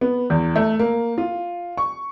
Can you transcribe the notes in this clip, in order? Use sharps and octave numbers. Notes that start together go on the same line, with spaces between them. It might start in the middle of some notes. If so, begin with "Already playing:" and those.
B3
E2
A3
A#3
F4
C#6